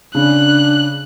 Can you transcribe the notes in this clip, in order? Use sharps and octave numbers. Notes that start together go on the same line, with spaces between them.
C#3 D4 F#6